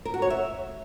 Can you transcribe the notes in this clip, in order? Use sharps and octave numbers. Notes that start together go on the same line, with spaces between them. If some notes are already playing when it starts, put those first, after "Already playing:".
A#4
F#4
C#5
E5